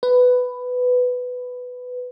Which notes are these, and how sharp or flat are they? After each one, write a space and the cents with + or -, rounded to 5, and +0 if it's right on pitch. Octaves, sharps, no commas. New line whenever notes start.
B4 +10